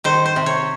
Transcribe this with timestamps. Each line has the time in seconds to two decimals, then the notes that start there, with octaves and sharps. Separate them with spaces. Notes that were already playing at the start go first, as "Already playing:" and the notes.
0.04 D#3 C5
0.26 C5
0.36 C3
0.46 C#5